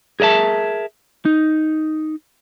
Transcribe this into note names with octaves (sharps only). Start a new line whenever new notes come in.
G#4 A#4 D#5 E5 A5
D#4